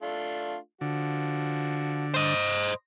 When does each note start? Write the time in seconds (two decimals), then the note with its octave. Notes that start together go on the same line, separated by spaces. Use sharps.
0.02 A3 D4 F4
0.81 D3 F3 F#4
2.14 C5 D#5